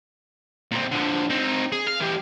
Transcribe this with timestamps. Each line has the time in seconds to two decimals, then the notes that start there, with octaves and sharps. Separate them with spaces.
0.71 A#2 C4
0.91 D3 F3
1.30 C4 D#4
1.72 G#4
1.87 F5
2.01 E3 G4